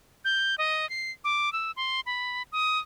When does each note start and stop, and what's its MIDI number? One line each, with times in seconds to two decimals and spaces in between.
0.25 0.55 91
0.58 0.88 75
0.90 1.11 96
1.24 1.52 86
1.53 1.71 88
1.76 2.01 84
2.06 2.43 83
2.52 2.79 87